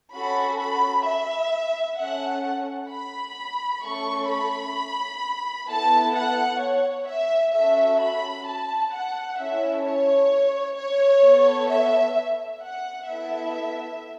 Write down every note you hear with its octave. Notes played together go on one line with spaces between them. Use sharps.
C#4 F#4 A4 B5
B5
E5
C#4 A4 F#5
B5
A3 C#4 A4 C#6
B5
B3 E4 A4 A5
F#5
C#5
E5
C#4 F#4 A4 E5
B5
A5
F#5
C#4 E4 A4 E5
C#5
C#5
B3 A4
E5
F#5
B3 E4 A4 E5